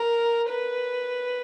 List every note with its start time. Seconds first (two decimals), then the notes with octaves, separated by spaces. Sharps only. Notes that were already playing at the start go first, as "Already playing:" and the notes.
Already playing: A#4
0.49 B4